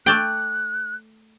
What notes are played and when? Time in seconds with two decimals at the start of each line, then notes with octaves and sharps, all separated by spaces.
0.06 A3 D5 G5 F#6